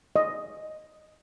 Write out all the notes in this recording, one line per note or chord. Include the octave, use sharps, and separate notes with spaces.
D#5